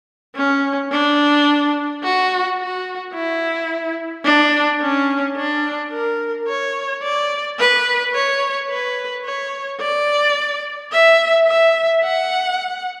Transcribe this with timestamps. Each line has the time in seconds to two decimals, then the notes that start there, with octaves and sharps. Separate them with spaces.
0.36 C#4
0.92 D4
2.03 F#4
2.59 F#4
3.14 E4
4.24 D4
4.81 C#4
5.37 D4
5.91 A#4
6.48 C#5
7.02 D5
7.59 B4
8.14 C#5
8.69 B4
9.25 C#5
9.80 D5
10.92 E5
11.48 E5
12.04 F#5